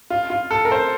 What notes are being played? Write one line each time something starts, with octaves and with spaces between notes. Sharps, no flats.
F4
F4
A4
A#4
C5